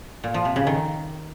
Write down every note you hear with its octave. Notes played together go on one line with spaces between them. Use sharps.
A#2
F3
C3
C#3
D#3